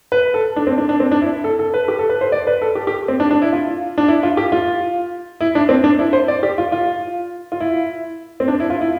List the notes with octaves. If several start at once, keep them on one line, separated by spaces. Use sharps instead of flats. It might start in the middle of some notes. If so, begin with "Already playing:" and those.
B4
A4
D4
C4
D4
D4
C4
D4
E4
A4
A4
B4
G4
A4
B4
C5
D5
B4
A4
G4
G4
C4
D4
D4
E4
F4
D4
E4
F4
G4
F4
E4
D4
C4
D4
E4
C5
D5
G4
F4
F4
F4
E4
C4
D4
E4
F4
E4